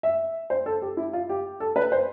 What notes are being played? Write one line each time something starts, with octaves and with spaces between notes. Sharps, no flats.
E5
C5
A4
G4
E4
F4
G4
A4
B4
C5